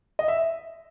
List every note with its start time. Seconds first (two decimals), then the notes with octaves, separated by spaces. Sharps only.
0.19 D#5
0.28 E5